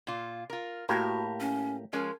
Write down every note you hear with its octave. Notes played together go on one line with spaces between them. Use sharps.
A#2 F4
F4 A#4
A2 A#3 F#4 G4 A#4 A#5
C#4
F3 G#3 C#4 A#4